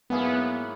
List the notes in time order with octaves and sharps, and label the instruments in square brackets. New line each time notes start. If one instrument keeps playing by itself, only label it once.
[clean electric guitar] G#2 F#3 A#3 E4 G#4 [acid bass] B3